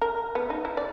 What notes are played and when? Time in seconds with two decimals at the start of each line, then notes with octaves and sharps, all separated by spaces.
0.01 A#4
0.35 B3
0.50 D#4
0.65 E4
0.77 D5